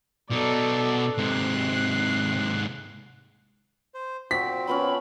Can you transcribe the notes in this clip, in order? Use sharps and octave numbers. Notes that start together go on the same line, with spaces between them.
B2 D#4 A4 D5
G#2 C3 F#6 C7
C5
A#2 F3 C4 F#4 B6
F3 B3 C#4 B5